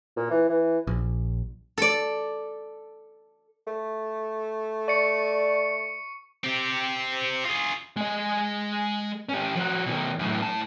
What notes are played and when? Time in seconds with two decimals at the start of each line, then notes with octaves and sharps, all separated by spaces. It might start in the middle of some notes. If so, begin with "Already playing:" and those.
0.17 A#2
0.30 E3
0.49 E3
0.87 A#1
1.78 A4 D5
3.67 A3
4.88 D5 C#6 C#7
6.44 C4 G4
7.45 F4 G#4
7.97 G#3 D#5
9.29 C#4 G4
9.56 F3 F#4
9.86 B2 D#3
10.19 F#2 A2
10.42 A2 A5